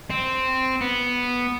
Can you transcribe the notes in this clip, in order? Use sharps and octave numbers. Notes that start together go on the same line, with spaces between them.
C4
B3